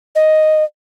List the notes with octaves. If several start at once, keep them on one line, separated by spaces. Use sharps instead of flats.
D#5